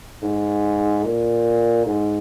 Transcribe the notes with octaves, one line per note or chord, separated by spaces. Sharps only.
G#2
A#2
G#2